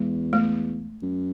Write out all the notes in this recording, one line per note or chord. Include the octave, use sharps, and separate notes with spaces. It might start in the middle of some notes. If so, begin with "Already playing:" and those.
Already playing: E2 G#3
A3
F#2